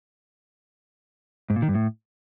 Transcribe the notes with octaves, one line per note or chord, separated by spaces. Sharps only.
G#2
A#2
D#3
G2
A2